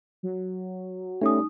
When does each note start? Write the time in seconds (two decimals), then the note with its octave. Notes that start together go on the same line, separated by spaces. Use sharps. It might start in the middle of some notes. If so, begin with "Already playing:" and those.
0.23 F#3
1.21 G3 A3 C#4 D#4 D#6